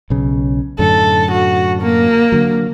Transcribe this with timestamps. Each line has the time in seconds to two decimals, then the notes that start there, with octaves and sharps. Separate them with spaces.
0.10 B1 C#3
0.79 F#2 A2 D3 A4
1.32 F#4
1.82 A#3
2.32 D3 F#3